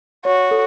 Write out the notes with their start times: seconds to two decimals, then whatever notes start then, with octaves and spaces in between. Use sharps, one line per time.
0.25 F#4 C#5
0.51 A4